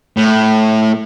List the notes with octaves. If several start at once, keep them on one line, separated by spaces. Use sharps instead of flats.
A2